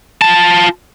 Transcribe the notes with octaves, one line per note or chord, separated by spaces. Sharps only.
F4 A5